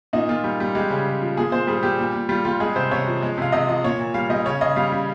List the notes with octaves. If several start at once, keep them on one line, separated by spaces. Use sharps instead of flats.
A#2 D#4
A#2 F4
G3
G3
G#3 G4
C#3
C#3
F3
A#2 G#4
A#2 C5
G3 G#4
G3 G4
A#2
A#2
G3 F4
G3 F4
G#3 G#4
C3 C5
C3 C#5
F3
G#3
C3 F5
C3 D#5
F3 D#5
A#2 C#5
A#2
G3 F5
G3 D#5
C#3 C#5
C#3 D#5
G3 F5
G3